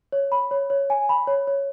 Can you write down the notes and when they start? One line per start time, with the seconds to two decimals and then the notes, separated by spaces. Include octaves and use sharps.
0.12 C#5
0.32 B5
0.51 C#5
0.70 C#5
0.90 G#5
1.09 B5
1.27 C#5
1.47 C#5